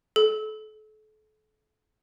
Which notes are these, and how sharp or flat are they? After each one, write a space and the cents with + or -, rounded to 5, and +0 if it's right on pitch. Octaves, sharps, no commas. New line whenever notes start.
A4 -35